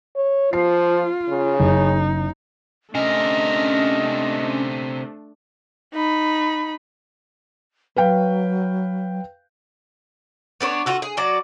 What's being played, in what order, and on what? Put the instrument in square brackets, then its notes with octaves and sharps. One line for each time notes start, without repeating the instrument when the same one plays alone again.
[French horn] C#5
[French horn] F3 [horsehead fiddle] F4 [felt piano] C7
[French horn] C#3
[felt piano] F#1 [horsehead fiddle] D#4
[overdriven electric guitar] C3 A#4 [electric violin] A3 D4 [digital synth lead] C#4 [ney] D#5
[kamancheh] D#4 B5
[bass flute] F#3 [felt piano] B4 F5 G5
[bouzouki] B3 D4 B4 C#5
F4 F#4 A4
G#4
F#3 F#4 D5